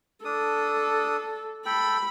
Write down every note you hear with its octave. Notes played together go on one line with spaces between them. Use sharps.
D4 A4 D#6
A4 G5 B5